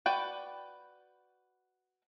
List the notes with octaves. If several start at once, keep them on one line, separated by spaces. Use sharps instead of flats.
F#4 B4 D5 G5